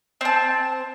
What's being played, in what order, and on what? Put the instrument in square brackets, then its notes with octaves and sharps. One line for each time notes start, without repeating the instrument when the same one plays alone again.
[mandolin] C4 A5